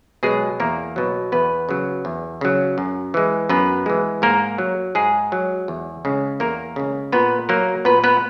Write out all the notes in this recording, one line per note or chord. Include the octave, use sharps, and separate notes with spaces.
B2 F#3 G#3 G#4
E2 A#3 A#4
B2 F#3
E2 B3 B4
C#3 F#3
E2
C#3 F#3
F#2
E3 G#3
F#2 B3 B4
E3 G#3
G#2 A#3 A#4
F#3
G#2 G#3 G#4
F#3
E2
C#3 G#3
E2 A#3 A#4
C#3 G#3
A#2 B3 B4
F#3 A#3 A#4
A#2 B3 B4
B3 B4